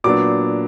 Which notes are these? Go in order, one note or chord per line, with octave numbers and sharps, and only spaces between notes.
A#2 F#3 B3 D4 D6